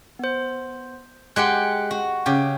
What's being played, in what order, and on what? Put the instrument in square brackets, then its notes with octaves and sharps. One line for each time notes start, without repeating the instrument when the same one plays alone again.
[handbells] B3 C5
[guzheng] G#3 G4 G5 [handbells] F#5 F#6
[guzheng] F#4
C#3 G4